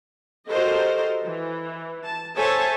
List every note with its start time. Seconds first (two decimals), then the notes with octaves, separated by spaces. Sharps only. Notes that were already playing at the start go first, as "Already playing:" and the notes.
0.50 F#4 G4 A4 A#4 C5 D#5
1.25 E3
2.05 A5
2.36 A4 C5 C#5 E5 G#5 A5